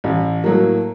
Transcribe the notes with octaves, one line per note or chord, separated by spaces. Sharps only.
A1
A2 F#3 A#3